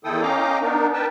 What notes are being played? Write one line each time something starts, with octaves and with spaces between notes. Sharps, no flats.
E2 D#3 E4 A4 G5 D#6
C#4 D#5 F5 G5 A#5 D6
B3 D4 D#4 A#4
A#4 B4 G5 A5